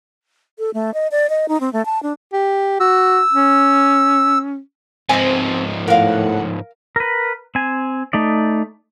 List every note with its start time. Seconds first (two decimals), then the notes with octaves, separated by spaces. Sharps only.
0.59 A4
0.74 A3
0.94 D#5
1.11 D5
1.30 D#5
1.48 D#4
1.61 C4
1.73 A3
1.85 A5
2.03 D4
2.33 G4
2.80 F#4 E6
3.32 C#4
5.09 G#2 F3 C4 D#5 G#5
5.88 A2 A#4 F5 F#5
6.96 A#4 B4
7.55 C4 G#5
8.13 A3 D#4 D5